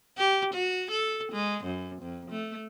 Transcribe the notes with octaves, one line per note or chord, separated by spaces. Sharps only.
G4
F#4
A4
G#3
F#2
F2
A3